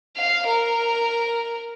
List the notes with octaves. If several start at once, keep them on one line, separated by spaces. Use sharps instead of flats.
F5
A#4